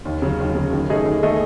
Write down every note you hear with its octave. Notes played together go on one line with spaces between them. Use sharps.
D#2
C#3 F#3
D#2
C#3 F#3
D#3
A3 D#4 G#4 D#5
D#3
A3 D#4 G#4 D#5